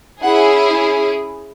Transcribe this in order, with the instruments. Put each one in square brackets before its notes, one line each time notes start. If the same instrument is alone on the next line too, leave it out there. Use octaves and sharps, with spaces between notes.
[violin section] C#4 E4 G#4 F#5